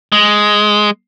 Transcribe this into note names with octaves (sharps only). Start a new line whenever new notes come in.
G#3